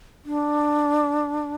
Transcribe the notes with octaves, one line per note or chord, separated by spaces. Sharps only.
D4